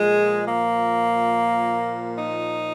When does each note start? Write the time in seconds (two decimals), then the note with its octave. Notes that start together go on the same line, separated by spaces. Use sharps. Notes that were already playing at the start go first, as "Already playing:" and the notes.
Already playing: A#2 F3 G#3
0.46 A#3
2.19 D#4